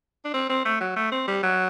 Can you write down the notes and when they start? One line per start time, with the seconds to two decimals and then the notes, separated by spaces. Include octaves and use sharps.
0.25 D4
0.34 C4
0.49 C4
0.65 A3
0.80 F#3
0.96 A3
1.12 C4
1.28 G3
1.43 F#3